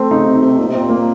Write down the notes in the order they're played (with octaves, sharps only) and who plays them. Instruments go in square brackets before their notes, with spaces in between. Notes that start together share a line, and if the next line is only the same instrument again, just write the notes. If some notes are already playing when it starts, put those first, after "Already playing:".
Already playing: [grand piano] A3 C4
[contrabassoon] C#3 [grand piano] D#4
[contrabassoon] C3
[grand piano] D#4
[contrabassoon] C3
[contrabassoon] A#2 [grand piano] D#4
[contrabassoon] C3
[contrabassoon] A#2 [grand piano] C4
[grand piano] A#3